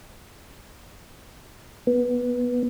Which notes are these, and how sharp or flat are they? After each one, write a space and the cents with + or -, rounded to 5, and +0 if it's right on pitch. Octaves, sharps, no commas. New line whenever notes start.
B3 -10